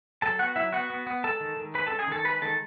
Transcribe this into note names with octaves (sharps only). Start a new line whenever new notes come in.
F#3 A4 A5
B3 F#4 F#5
F#3 E4 E5
B3 F#4 F#5
B3
B3
G#3 A4 A5
D#3
D#3
G#3 B4 B5
C#4 A4 A5
G#4 G#5
D#3 A4 A5
G#3 B4 B5
D#3 A4 A5